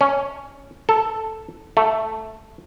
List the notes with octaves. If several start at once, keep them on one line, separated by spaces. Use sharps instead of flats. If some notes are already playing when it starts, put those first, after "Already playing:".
C#4
A4
A3